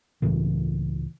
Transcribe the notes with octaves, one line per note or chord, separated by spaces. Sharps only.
C#2 A2 C#3 E3